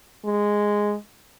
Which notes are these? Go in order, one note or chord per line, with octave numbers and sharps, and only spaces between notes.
G#3